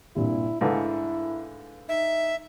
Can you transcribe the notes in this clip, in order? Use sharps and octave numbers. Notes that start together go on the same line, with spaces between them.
C2 G2 A#2 E4
G#2 D3 A3 E4 B4 F5 G#5
D#4 E5